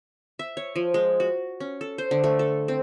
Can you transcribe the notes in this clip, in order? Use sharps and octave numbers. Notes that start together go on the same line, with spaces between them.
E5
C#5
F3
G#3
F#4
C#4
A4
C5
D3
A3
A4
C4